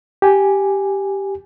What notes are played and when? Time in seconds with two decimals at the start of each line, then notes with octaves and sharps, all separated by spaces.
0.22 G4 G#5